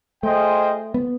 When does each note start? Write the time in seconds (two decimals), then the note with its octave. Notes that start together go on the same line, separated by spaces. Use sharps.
0.23 A3 F4 G#4 C5 D#5 G5
0.94 B3